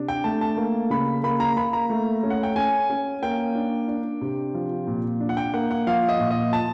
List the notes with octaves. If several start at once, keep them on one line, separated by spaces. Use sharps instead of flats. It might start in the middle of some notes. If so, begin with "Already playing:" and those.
Already playing: C3 D4
G5
A3 A5
A5
A#3
C#3 B5
A#3 B5
A#5
A#3 B5
A#5
A3
C#4
F#5
G5
C#4 G#5
C#4
A#3 G5
D4
D4
C3
F3
A#2
D4
F#5
G5
A#3 F#5
F#5
F3 F5
D#5
A#2
D#5
F3 A5